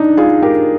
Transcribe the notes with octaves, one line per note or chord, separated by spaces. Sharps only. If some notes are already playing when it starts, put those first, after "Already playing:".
Already playing: D4 D#4
F4 G#4
G4 A#4